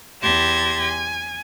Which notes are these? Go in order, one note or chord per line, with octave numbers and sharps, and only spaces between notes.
E2 G4 A5 C6 G#6 A#6
G#5